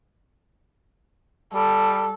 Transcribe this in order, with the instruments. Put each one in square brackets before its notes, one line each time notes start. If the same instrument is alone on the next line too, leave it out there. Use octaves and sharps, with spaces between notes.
[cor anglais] G3 [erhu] A4